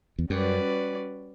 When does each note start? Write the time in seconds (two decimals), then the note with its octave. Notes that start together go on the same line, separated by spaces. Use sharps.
0.19 E2
0.30 F#2 G3 C#4 F#4 B4 D5